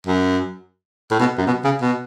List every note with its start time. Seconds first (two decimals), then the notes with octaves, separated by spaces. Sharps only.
0.07 F#2
1.11 A2
1.19 B2
1.38 F#2
1.47 B2
1.64 C#3
1.81 B2